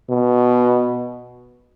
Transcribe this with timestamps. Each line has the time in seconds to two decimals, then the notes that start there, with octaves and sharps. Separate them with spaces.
0.10 B2